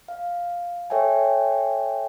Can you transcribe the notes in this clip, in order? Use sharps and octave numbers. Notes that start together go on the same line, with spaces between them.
F5
A4 C#5 E5 G5 G#5